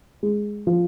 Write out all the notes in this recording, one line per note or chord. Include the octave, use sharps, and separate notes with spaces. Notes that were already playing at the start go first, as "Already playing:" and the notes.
G#3
F3